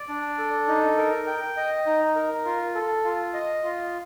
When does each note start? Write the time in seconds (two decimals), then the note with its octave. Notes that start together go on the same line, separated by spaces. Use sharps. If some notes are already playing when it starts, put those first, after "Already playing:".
Already playing: D5
0.09 D4
0.38 A4
0.68 D#4
0.97 A#4
1.27 G5
1.57 D#5
1.86 D#4
2.15 A#4
2.45 F4
2.75 A4
3.04 F4
3.34 D#5
3.64 F4